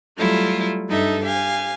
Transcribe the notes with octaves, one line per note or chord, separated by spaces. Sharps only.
F#3 G3 A3 E4 F4
G2 D#4 A4 E5
G4 F5 G#5